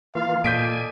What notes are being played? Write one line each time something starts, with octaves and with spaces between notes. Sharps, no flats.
E3 A#3 F4 F5
A#2 A4 D5 D#5 G#5 G6 B6 D7